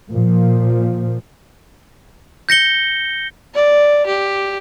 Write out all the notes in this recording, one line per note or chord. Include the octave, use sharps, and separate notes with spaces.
A#2 F3
G6 A#6 C#7 G7
D5
G4